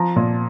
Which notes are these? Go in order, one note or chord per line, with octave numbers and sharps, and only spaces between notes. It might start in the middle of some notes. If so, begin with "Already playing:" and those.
Already playing: F3 A#5
A#2